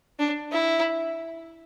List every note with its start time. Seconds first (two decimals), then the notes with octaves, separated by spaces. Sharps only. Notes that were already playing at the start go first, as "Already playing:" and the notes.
0.19 D4
0.52 E4